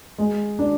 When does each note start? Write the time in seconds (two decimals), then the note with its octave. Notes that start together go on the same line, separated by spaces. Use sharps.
0.18 G#3
0.59 D4